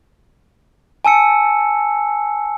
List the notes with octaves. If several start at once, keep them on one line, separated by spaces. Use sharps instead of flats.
G#5 A5 E6 C#7